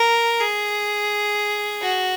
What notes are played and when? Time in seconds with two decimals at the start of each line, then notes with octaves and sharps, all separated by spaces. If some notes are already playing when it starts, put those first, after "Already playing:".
Already playing: A#4
0.40 G#4
1.82 F#4